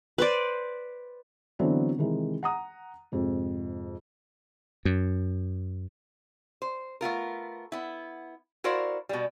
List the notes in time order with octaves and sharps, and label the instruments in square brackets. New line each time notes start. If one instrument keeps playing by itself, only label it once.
[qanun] B4 C5 D5
[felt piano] D3 E3 F#3 B3 C4 D4
C3 D#3 E3 G#3
F#5 A#5 D#6
F2 G#2 C3
[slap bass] F#2
[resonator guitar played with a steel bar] C5
A3 B3 F4 A#4
B3 E4
E4 F#4 A#4 C5 D5 F5
B2 G3